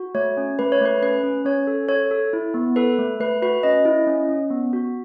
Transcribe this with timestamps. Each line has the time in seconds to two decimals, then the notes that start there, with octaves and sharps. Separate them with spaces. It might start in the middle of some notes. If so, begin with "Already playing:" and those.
Already playing: F#4
0.15 A3 C#5
0.37 C#4
0.59 A3 B4
0.72 C#5
0.81 A3 B4
1.02 C#4 B4
1.24 C#4
1.45 C#4 C#5
1.67 A4
1.89 A4 C#5
2.11 A4
2.33 E4
2.54 B3
2.76 A4 B4
2.99 A3
3.20 A3 B4
3.42 F#4 B4
3.63 C#4 D#5
3.85 E4
4.07 C#4
4.29 C#4
4.50 B3
4.73 F#4